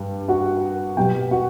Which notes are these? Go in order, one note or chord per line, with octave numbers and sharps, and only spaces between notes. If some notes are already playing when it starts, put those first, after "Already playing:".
Already playing: G2 G3
F#4 F#5
B2 F#3 G4 G5
F#4 F#5